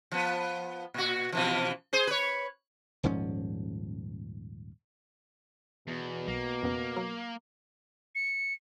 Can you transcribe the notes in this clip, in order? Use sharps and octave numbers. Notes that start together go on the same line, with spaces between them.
F3 B3
A#2 F#4
B2 E3 F3
G#4 C5
B4 C#5
D#1 G#2 F3 C#4
E2 B2
B1 A#3
F2 C#3 B3
F#3 A#4 F5
C#7